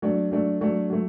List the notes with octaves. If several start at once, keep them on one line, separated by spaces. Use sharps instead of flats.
F#3 A3 D4
F#3 A3 D4
F#3 A3 D4
F#3 A3